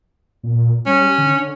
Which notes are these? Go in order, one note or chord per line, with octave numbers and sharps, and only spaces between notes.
A#2
G3 C#4
D3